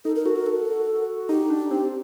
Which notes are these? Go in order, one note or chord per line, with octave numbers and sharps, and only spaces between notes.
D#4 A4
A#4
F#4 A4
A#4
A4
D#4 G4
D4
C4